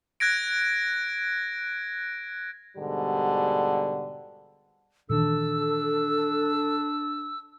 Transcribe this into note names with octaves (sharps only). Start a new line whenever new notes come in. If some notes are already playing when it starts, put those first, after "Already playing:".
F#6 G#6 A#6 D7
G#2 B2 D3 G3
A#2 D#3 E3 D4 A4 E6